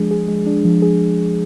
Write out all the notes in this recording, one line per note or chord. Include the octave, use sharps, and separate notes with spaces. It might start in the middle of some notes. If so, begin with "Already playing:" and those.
Already playing: F3 G#3 D4 G#4
G#4
G#3
D4
F3
G#4